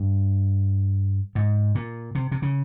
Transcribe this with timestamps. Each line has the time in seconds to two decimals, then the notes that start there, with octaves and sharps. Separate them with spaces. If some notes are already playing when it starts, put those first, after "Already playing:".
Already playing: G2
1.35 G#2
1.75 A#2
2.15 C3
2.31 C3
2.42 C#3